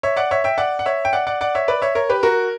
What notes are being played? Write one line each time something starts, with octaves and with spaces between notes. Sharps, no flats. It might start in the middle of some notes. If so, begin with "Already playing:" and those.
C#5 E5
D5 F#5
C#5 E5
E5 G5
D5 F#5
F#5
C#5 E5
G5
D5 F#5
D5 F#5
D5 F#5
C#5 E5
B4 D5
C#5 E5
A#4 C#5
G4 B4
F#4 A#4